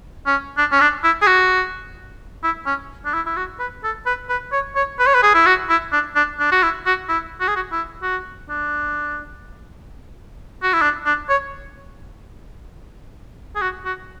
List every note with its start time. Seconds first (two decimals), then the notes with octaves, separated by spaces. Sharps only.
0.26 C#4
0.58 D4
0.72 C#4
0.81 D4
1.04 E4
1.22 G#4
1.27 F#4
2.44 E4
2.67 C#4
3.06 D4
3.14 E4
3.26 E4
3.37 F#4
3.60 B4
3.84 A4
4.06 B4
4.30 B4
4.52 C#5
4.76 C#5
5.00 B4
5.07 C#5
5.14 B4
5.23 G#4
5.34 E4
5.46 F#4
5.69 E4
5.92 D4
6.16 D4
6.40 D4
6.52 F#4
6.63 E4
6.86 F#4
7.09 E4
7.41 F#4
7.48 G#4
7.56 F#4
7.72 E4
8.03 F#4
8.50 D4
10.63 F#4
10.73 E4
10.82 D4
11.06 D4
11.29 C#5
13.56 G#4
13.61 F#4
13.85 F#4